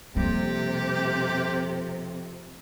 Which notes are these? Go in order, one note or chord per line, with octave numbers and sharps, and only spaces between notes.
F2 C3 G3 A#3 G4